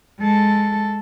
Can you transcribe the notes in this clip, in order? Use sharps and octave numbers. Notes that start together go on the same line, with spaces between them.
G#3 A4